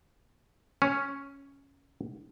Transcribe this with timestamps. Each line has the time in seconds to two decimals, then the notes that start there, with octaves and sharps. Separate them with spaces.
0.82 C#4